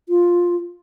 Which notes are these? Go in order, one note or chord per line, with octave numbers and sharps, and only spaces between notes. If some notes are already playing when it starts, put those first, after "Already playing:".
F4